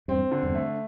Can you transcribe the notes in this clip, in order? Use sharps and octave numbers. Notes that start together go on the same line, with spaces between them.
E2 G2 C4
D3
E2 G2
A3